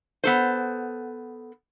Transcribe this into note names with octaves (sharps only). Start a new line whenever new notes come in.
B3 A4 C5